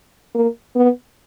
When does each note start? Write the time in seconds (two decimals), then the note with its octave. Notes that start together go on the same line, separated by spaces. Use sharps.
0.35 A#3
0.76 B3